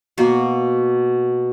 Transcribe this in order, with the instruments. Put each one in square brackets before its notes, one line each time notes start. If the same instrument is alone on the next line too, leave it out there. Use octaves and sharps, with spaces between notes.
[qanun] B2 A#3 F#4